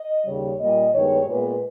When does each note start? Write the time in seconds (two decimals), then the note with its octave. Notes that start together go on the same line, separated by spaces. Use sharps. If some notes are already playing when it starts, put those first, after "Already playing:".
Already playing: D#5
0.25 D#2 C#3 G3 C#5
0.59 A#2 G3 A#3 D#5
0.94 G2 D#3 G#3 B3 C#5
1.28 A#2 G#3 B3 B4